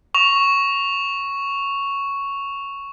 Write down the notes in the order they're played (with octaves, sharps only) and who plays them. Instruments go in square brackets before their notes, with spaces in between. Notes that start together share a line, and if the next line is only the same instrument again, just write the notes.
[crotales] C#6 F7